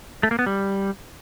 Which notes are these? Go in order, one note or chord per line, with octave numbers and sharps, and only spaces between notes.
A3
A#3
B3
G3